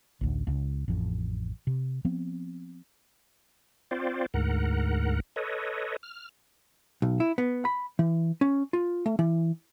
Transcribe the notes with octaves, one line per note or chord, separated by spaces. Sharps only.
A1 D2
C#2
A1 F2
C3
F3 B3 C4
C4 F4 C5 D5
D2 G#2 A#4 F#5
A4 B4 C#5 D#5
F6
B1
E4
B3
B5
E3
C#4
F4
A3
E3